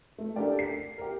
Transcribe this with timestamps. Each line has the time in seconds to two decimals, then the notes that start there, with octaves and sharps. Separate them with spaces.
0.18 A3
0.36 D4 G4 A4 A#4 D5 G5
0.59 C7
0.98 G4 A#4